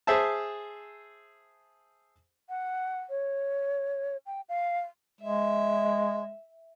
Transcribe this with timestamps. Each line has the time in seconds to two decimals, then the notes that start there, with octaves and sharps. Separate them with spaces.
0.07 G#4 C5 E5 A5
2.49 F#5
3.10 C#5
4.26 G5
4.49 F5
5.21 G#3 E5